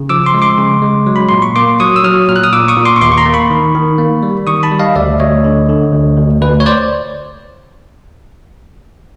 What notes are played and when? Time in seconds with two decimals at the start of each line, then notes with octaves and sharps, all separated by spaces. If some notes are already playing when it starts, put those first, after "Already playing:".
Already playing: C#3
0.09 F3 D6 E6
0.26 C6 D6
0.34 G#3
0.42 C6 D6
0.58 C#3
0.82 G#3
1.06 F#3
1.16 B5
1.29 A#2 C6
1.42 C#6
1.56 A#3 C6 D6
1.80 F#3 C#6 D#6
1.96 E6
2.04 F#3 D#6 F6
2.29 A#2 F6
2.36 F#6
2.43 D#6 F6
2.53 A#2 D6 E6
2.68 C#6 D#6
2.77 A#2
2.85 C6 D6
2.96 C#6
3.01 D#2 C6 D6
3.12 C#6
3.17 A#5 C6
3.26 A#3
3.34 B5 C#6
3.50 D#3
3.74 D#3
3.98 A#3
4.23 G3
4.47 D#3 C#6 D#6
4.63 A5 B5
4.71 G3
4.80 D#5 F5
4.96 D2 D5 E5
5.20 D2 C#5 D#5
5.44 D3
5.69 D3
5.93 D2
6.17 D2
6.42 D2 B4
6.60 C#5
6.66 C5 D5